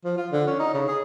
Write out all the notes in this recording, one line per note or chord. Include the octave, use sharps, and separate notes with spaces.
F3
F4
D3
C#4
D#4
C#3
G#4